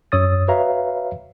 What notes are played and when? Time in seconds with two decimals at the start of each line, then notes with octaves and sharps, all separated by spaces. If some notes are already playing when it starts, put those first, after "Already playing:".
0.12 F#2 C#5 D#6 E6 A6
0.48 F#4 B4 C#5 E5 F5 A#5